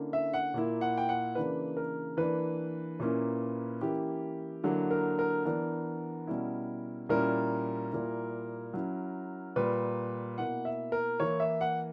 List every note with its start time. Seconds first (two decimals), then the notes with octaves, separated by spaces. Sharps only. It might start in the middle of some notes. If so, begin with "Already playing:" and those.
Already playing: D3 A#3 C#4 E4
0.13 E5
0.33 F#5
0.54 A#2 A#3 E4
0.81 F#5
0.98 G5
1.09 F#5
1.35 C#3 E3 A#3 D4 B4
1.77 A#4
2.17 E3 A#3 D4 B4
3.00 A#2 A#3 C#4 E4
3.81 E3 A#3 C#4 E4 G4
4.64 D3 F#3 A#3 E4
4.91 A#4
5.19 A#4
5.45 E3 B3 D4 A#4
6.27 B2 G3 C#4 E4
7.09 A#2 G3 C#4 E4 A#4
7.91 A#2 G3 A#3 E4
8.74 F#3 C#4 E4
9.56 A#2 G3 A#3 B4
10.38 B2 A#3 E4 F#5
10.65 E5
10.92 A#4
11.20 E3 A#3 E4 C#5
11.40 E5
11.61 F#5